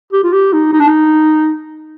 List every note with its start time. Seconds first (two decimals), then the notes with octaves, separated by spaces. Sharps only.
0.13 G4
0.24 F4
0.33 G4
0.53 D#4
0.73 D#4
0.80 D4
0.87 D#4